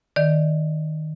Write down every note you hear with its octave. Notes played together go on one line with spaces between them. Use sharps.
D#3 D5